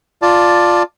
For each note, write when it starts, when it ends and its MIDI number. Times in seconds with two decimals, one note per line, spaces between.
0.22 0.83 65
0.22 0.83 74
0.22 0.83 81